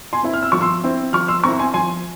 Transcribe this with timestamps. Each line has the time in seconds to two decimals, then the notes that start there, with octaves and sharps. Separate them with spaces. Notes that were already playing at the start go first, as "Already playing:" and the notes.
0.13 G#5 C6
0.23 C4 E4
0.34 F6
0.43 E6
0.52 F3 C#6
0.61 C6 E6
0.84 C4 E4
1.13 F3 C#6 F6
1.28 C6 E6
1.44 C4 E4 A#5 C#6
1.59 G#5 C6
1.74 F3 G#5 C6